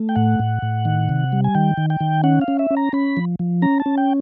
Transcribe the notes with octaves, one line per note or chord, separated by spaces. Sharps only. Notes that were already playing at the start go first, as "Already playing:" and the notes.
Already playing: A3
G5
A2 F#5
A2
A2
D#3
C3
G3
G#5
D#3 G5
D#3
G5
D#3
C#4 F#5
F5
C#4
E5
C#4
A#5
C#4 B5
F3
F3
C#4 A#5
A5
C#4
G5